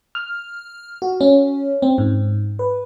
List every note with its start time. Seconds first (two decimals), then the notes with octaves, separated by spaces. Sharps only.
0.15 F6
1.02 F#4
1.21 C#4
1.82 C4
1.98 G#2
2.59 B4